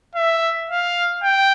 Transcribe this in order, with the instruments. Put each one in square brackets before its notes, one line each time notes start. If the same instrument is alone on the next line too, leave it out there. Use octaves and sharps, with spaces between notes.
[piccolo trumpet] E5
F5
G5